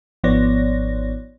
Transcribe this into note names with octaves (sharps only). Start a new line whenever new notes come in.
G#1 F3 B3 C#5 D5 A#6